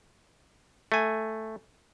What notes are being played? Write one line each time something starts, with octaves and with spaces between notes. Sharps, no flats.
A3 G#5